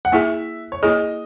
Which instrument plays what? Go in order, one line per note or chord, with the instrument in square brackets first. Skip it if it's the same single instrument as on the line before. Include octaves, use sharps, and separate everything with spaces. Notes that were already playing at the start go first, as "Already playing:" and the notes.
[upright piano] F#5
[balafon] A#3 E4 G#4 [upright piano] E5
[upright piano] C#5
[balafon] A#3 E4 G#4 [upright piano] D#5